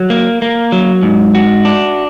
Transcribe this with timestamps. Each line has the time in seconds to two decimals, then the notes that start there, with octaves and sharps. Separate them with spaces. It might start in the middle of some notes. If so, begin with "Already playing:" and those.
Already playing: F#3
0.10 A#3
0.42 A#3
0.72 F#3
1.03 G#2
1.35 F#4
1.65 D4